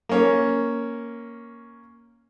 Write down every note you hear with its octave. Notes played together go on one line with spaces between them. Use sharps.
A#3 C#4